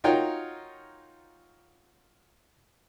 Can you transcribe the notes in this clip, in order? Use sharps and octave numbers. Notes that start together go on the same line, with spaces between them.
D#4 F4 F#4 A#4 C#5 G5